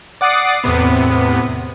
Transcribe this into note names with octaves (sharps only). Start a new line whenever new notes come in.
D5 F#5 D6 D#6 A6 C7
E2 A2 C3 B3